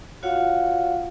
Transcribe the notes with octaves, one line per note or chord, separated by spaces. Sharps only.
F4 F#4 C#5 F5 F#5